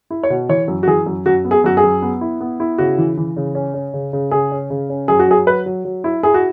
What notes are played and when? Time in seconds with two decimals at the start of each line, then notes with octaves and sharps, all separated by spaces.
0.10 E4
0.23 C#5
0.30 B2
0.49 E3 C#5
0.68 F#2
0.83 F#4
0.87 E3 G#4
1.06 F#2
1.26 F#2 F#4
1.45 B3
1.51 G#4
1.64 F#2 F#4
1.77 G#4
1.84 F#2
2.02 B3
2.21 E4
2.40 B3
2.60 E4
2.78 C#3 F#4
2.98 E3
3.17 E3
3.36 C#3
3.55 C#4
3.74 C#4
3.93 C#3
4.13 C#3
4.31 C#3 G#4
4.52 C#4
4.70 C#3
4.90 C#4
5.08 F#2 G#4
5.19 F#4
5.28 F#3 G#4
5.47 F#3 B4
5.66 F#3
5.85 F#3
6.04 E4
6.23 E4 G#4
6.34 F#4